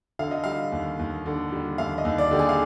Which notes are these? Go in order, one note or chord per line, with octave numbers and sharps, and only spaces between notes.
D3 F5
D#5
G3 F5
D#2
D#2
D3
G3
D#2 F5
D#5
D#2
D5
D3 G4
G#4
F5